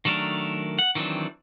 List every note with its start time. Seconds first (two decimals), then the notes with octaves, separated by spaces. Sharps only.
0.05 D#3 F#3 A3 D4 A#4
0.79 F#5
0.95 D#3 E3 F#3 C4 D4